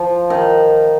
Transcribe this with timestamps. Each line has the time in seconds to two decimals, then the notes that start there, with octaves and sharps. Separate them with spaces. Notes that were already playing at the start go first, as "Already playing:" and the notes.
Already playing: F3
0.30 D#3